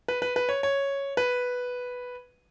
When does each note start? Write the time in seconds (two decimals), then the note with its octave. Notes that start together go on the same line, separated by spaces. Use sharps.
0.08 B4
0.22 B4
0.36 B4
0.49 C#5
0.63 C#5
1.17 B4